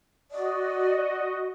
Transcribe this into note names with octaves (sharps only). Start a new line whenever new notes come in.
F#4 D5 D#5